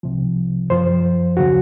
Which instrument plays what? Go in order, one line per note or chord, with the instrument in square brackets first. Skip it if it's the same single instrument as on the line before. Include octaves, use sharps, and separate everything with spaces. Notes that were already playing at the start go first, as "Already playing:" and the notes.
[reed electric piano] C2 C3 F3
F#2 F3 C5
D#2 C#3 F#3 F#4